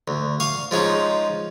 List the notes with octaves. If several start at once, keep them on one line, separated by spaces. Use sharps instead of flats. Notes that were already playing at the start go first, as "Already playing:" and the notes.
D2
F5 C#6 D#6
F3 G#3 C#4 D#4